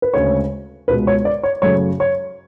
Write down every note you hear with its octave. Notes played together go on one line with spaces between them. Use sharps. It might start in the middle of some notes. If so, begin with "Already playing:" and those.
B4
D2 C#3 G#3 C#5
C#2 B2 G#3 B4
C#5
D5
C#5
F#2 C#3 F#3 A3 C#5
C#5